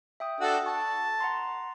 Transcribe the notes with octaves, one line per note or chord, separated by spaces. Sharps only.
E5 G5 D#6
D4 F#4 A4
A5 C#6
F#5 A#5 C6